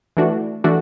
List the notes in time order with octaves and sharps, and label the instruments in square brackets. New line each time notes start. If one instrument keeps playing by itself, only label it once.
[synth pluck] E3 A3 D4 F#4
E3 A3 D4 F#4